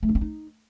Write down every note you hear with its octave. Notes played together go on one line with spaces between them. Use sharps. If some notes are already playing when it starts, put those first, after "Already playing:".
A3
D4
C4
D#4